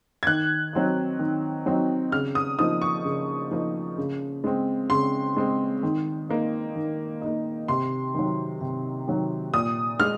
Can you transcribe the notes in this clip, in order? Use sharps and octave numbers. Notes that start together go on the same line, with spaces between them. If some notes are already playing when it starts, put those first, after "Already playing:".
G#6
D#3 F#6
F#3 C4 D#4
D#3
F#3 C4 D#4
C#3 F6
D#6
F3 A#3 D#4 D#6
C#6
C#3
F3 A#3 D#4
C#3
G#3 C4
C#3 C6
G#3 C4
D#3
A#3 D#4
D#3
A#3 D#4
C3 C6
D#3 F#3
C3
D#3 F#3
A#2 D#6
G#3 F6